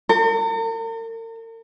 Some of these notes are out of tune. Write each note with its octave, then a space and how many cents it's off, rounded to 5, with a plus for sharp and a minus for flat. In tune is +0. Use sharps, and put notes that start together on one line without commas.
A#4 -45